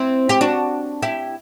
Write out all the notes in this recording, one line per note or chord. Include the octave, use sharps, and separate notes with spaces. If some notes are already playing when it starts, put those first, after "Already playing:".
Already playing: C4 E4
G4
D4 F#4
E4 G4